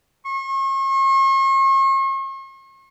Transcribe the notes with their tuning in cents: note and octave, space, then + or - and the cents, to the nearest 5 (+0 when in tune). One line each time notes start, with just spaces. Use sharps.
C#6 -45